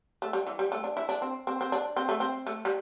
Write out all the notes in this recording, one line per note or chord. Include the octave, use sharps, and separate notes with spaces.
A3
G3
E3
G3
A3
D4
E4
D4
C4
C4
C4
D4
C4
A3
C4
A3
G3